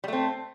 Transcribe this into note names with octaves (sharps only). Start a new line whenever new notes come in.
G3 A3 C4